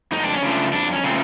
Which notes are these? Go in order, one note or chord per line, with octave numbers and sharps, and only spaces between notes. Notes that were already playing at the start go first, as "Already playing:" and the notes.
F2 D#4
D4
C#4
C#3 F3 A3 D4
F2 D4
C#4
C#3 F3 A3 C4